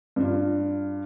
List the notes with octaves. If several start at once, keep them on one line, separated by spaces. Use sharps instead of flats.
G2 F4